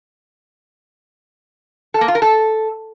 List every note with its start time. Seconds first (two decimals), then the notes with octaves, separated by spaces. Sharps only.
1.94 A4
2.01 A#3
2.08 F4
2.15 A#4
2.22 A4